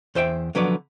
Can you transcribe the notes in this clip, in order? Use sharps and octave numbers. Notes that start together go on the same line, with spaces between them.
E2 C5 E5 G5
D3 F3 F#3 B3 B4 D5